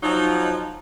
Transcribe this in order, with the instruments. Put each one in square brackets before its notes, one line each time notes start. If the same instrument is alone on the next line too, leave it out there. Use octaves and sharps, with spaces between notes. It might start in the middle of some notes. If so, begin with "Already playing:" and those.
[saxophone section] F3 F#3 D#4